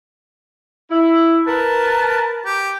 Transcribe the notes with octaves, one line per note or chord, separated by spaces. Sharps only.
E4
A#4 B4 A5
G4